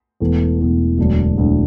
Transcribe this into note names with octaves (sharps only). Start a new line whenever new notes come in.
E1 E2 E3 A3
E1 E2 E3 A3
E1 D2 D3 F#3 D4
E1 D2 D3 F#3 D4